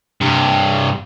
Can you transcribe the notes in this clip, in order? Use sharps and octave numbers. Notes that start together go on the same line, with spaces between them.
G2 C3